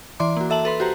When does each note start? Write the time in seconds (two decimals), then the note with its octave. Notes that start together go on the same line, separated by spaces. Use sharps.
0.20 E3 D5 C6 D6
0.36 A#3 F#4
0.50 A4 E5 A5 F#7
0.65 A4 B4 C6
0.80 F#4 G4 C5 A#5